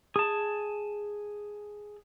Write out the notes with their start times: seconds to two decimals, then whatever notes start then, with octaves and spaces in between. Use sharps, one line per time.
0.16 G#4 A5